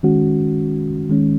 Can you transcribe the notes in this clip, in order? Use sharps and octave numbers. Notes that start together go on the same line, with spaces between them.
D#3 G#3 C#4 F#4
D#3 G#3 C#4